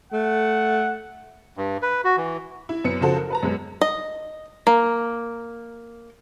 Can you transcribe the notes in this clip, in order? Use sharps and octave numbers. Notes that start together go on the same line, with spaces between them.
A3 F#5
G2
B4
F#4
E3
E4
F#2 B3 C#7
C#3 F3 F#4 A4 C5
A#4
B4 A5 A#5
F#2 G#3 B3
D#5
A#3